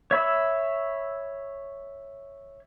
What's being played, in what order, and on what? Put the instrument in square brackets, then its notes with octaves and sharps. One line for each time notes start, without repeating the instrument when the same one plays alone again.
[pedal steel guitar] C#5 E5 B5 E6